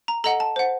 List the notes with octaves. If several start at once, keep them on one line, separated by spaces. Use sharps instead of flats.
A#5
A4 D#5 F#5 A#5
A5
C5 F#5